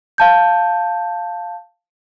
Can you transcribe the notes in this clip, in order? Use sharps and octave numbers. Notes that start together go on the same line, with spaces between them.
F5 A5 G6